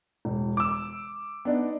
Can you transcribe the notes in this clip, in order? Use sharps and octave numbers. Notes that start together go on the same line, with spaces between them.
E1
D6 E6
B3 D4 D#4